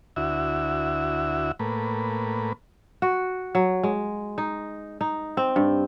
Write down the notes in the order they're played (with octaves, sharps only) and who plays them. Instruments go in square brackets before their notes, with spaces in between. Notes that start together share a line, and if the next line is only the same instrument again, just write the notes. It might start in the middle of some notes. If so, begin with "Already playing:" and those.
[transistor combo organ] D2 E4 F#4 E5
A2 A#3 B4
[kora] F#4
F#3
G#3
D#4
D#4
C4
G2